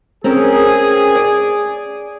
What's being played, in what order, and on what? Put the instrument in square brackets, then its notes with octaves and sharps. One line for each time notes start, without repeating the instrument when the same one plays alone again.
[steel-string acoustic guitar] C4 C#4 A#4 [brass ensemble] G#4
[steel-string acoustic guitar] D5